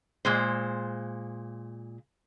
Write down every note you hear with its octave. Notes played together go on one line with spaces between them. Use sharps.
A#2 G#3 C5